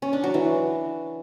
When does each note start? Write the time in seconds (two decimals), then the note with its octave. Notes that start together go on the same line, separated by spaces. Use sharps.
0.02 C#4
0.13 D4
0.23 F#3
0.34 E3